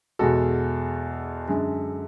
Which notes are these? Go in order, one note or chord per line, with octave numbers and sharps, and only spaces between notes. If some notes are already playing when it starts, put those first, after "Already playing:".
E2 B2 G#3 F#4 A4
F#2 D3 G#3